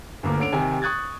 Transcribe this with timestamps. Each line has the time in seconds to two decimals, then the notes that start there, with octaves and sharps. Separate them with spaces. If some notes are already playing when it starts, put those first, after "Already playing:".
0.23 G1 D2 A#3 D6
0.39 D3 C#4 D7 F7
0.53 C3 D#3 G#5
0.82 C#6 D#6 F#6 G#6 A6